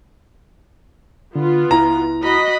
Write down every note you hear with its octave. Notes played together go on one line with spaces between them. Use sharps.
D3 B3 F4
C#2 E4 A#5
F#4 D#5 B5